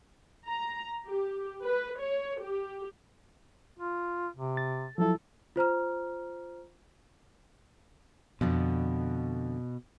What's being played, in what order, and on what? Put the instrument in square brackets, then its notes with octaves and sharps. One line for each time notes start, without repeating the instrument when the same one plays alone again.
[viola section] A#5
G4
B4
C#5
G4
[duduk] F4
C3
[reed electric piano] A6
[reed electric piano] F3 F#3 E4 [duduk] A4
[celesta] F4 C5 A#5 F6
[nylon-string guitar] F2 D3 D4 [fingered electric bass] B2